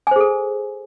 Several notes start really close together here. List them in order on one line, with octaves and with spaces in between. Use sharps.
G#5 C5 G#4 A4